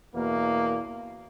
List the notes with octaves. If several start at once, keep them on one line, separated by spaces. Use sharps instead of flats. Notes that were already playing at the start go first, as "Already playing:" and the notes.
E2 B2 A#3